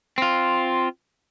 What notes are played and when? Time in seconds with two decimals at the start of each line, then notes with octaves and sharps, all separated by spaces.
0.18 C4 F4